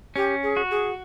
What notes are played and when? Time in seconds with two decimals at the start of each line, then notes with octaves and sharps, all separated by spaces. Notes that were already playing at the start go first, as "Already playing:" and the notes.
0.16 C#4 G4
0.43 G#4
0.57 F#4
0.71 G#4